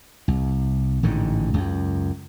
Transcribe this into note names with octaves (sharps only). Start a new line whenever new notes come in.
C2
A1 G#2 D3 D#3
C#2 F#2